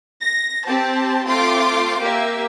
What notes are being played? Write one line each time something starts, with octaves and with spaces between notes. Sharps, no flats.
A#6
C4 G4 C5 A5
A3 C4 F4 C6 D6
A#3 G4 E5